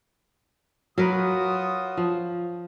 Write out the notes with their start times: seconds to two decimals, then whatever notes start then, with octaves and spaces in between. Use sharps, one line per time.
0.98 F#3 F4 F#4 A#4 B4 D#6
1.97 F3